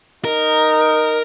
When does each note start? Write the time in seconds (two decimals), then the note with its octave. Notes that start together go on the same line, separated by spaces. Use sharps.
0.25 D#4 A#4